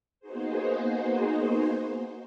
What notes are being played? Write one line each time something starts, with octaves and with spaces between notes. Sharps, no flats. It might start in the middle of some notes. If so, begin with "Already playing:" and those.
A#3 B3 D#4 F#4 G#4 C5